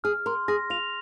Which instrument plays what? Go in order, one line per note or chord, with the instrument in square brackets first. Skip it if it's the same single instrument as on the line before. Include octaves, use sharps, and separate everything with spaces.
[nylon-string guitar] G#4 [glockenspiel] F6
[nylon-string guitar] A#4 [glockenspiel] C6
[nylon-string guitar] G#4 [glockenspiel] A#6
[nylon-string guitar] F4 [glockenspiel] F7